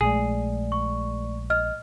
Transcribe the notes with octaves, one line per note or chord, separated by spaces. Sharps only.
A#1 G#3 A3 G#4 D5
C#6
D#5 F6